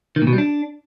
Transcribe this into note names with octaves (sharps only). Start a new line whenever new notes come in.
D#3
A#2
B2
G3
D4